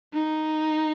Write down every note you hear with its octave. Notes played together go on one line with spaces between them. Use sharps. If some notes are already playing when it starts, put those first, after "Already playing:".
D#4